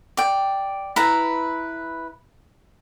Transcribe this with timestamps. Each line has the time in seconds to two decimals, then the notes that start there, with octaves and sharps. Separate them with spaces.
0.17 D5 G5
0.96 E4 B4 A#5